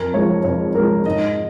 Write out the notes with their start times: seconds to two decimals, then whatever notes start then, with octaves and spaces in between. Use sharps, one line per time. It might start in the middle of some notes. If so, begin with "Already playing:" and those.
Already playing: F2 A#4
0.14 F3 G#3 C#5
0.44 F2 C#5
0.75 F3 G#3 A#4
1.06 G#2 D#5